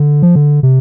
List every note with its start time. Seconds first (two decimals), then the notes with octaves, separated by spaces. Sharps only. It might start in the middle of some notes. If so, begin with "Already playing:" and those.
Already playing: D3
0.23 F3
0.35 D3
0.63 C3